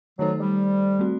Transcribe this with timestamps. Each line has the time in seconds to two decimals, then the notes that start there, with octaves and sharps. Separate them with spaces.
0.19 D#3 F#3 A3 D#4 A4 C5
0.39 G3
0.99 A3 C4 F#4